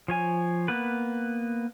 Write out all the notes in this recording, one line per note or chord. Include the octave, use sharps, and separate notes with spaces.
F3 C#5 G#5
A#3 B3 B4